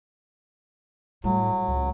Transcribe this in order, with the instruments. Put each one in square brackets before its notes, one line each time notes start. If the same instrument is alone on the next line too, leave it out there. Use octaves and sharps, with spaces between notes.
[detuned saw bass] A2 [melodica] F#3 [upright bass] G3
[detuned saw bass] C#2